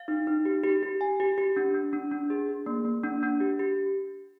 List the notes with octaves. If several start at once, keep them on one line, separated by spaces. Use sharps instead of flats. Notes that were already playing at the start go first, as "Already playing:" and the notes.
Already playing: F5
D#4
D#4
G4
G4
G4
G#5
G4
G4
D4
D4
D4
D4
G#4
G#4
A#3
A#3
D4
D4
G4
G4